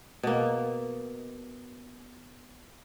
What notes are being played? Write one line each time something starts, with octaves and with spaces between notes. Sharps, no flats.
B2 A#3